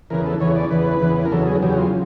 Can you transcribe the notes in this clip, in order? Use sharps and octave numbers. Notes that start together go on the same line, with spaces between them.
E2 C#3 E3 A#4
A4
E2 C#3 E3 C#5
D5
E2 C#3 E3 B4
E2 C#3 E3
A#4
E2 C#3 F#3 A4
G#4
E2 C#3 F#3 G4
F4